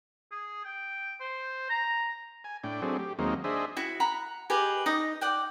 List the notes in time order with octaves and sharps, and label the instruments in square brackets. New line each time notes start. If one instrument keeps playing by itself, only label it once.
[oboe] G#4
G5
C5
A#5
[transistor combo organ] G#5
A2 D4 G5
F#3 A3 C4 D4 G#4
G4
D#2 F#3 G#3 A#3 C4 D#4
D4 G#4 C5 D#5 E5
[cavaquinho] E4 F#4
F#5 A#5 B5
G4 G#4 B4 D#5
D#4 D#5
D5 F#5 G5